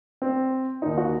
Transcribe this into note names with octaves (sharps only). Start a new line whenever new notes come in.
C4
D#2 D#3 D#4
F#4